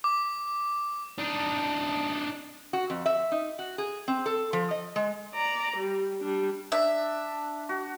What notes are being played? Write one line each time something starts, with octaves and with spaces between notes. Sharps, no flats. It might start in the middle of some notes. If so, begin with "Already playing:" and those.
D6
D4 D#4
F#4
F2
E5
D#4
F#4
G#4
C4
A4
F3
D#5
G#3
D5 A#5
G3
G3 D4
D4 E5
F#4